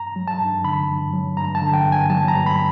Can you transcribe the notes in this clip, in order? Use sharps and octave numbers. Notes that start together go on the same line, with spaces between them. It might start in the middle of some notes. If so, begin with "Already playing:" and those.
Already playing: G2 A#5
F#3
A5
G2
D3 B5
G2
F#3
G2 A#5
A5
D3
G5
G2
G#5
F#3 A5
A#5
G2
B5